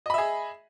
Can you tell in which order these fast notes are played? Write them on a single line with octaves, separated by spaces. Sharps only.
D#5 B5 E5 G#4